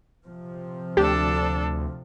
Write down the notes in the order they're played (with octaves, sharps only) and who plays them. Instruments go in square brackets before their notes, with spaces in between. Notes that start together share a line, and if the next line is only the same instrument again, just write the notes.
[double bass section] C3 F3
[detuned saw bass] D2 [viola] D4 A4 [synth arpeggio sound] G4